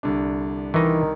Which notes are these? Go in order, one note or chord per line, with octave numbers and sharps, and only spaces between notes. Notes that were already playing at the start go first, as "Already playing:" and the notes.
C2 D3 D4
D#3 E3 D#4